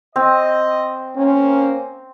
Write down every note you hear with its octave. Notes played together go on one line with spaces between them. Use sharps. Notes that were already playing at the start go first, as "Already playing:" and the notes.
C4 D#5
A#3 C#4 C5